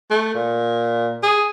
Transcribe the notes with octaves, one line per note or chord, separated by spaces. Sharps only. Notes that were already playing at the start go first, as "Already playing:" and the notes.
A3
A#2
G#4